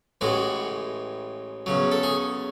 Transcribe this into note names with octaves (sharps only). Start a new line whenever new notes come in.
A1 A2 E3 G#3 F#4
E2 C#3 F#3
A4
G#4